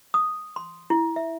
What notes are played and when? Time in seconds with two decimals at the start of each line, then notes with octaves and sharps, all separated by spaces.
0.14 D#6
0.56 C6
0.90 E4
1.16 E5